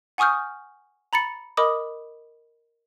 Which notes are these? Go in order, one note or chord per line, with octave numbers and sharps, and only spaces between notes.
F#5 G#5 C#6 D#6 F6 G6
A#5 B5 A6 C#7
A#4 D#5 B5 D6 D#6